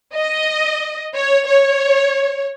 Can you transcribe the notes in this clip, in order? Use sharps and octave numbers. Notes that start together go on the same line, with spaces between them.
D#5
C#5
C#5